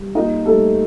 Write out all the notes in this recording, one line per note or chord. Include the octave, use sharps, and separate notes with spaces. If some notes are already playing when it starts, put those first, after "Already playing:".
Already playing: G3
A#3 D#4 D#5
G3 A3 A4